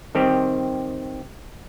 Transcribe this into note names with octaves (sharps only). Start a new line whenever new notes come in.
D#3 G3 C4 G4